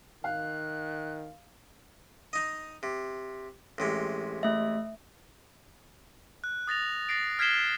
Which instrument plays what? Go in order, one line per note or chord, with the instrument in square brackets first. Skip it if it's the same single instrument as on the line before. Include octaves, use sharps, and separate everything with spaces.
[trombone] D#3 [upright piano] F5 [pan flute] F#6
[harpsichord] D#4 D#5
C3
A1 C3 G#3
[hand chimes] A3 E5
[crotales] F#6
D#6 A6 A#6 F7
A6 A#6 C7 D7
F6 G#6 B6 C7 E7 G7